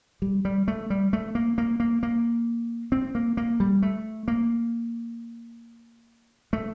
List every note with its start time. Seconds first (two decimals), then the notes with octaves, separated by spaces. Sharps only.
0.22 G3
0.45 G3
0.68 A3
0.90 G3
1.13 A3
1.35 A#3
1.58 A#3
1.80 A#3
2.03 A#3
2.92 C4
3.15 A#3
3.37 A#3
3.60 G3
3.82 A3
4.28 A#3
6.53 A3